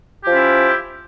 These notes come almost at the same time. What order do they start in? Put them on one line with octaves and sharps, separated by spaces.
G4 F3 F4 C#4 E4